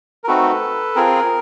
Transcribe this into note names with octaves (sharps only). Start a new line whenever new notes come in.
A#4
A3 C4 D#4 F#4 A4 B4
C4 F4 G#4 A#4